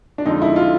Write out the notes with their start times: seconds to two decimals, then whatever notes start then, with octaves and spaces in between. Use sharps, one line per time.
0.18 D4
0.26 F2 D3 F3 G#3 D#4
0.42 E4
0.56 F4